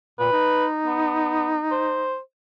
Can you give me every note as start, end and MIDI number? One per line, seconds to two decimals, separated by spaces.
0.19 0.31 46
0.19 0.66 71
0.32 2.14 63
0.86 1.55 59
1.71 2.18 72